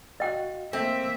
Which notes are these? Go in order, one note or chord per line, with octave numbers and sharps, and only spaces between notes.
F#4 D#5 F5 G5
A3 A#3 C4 E5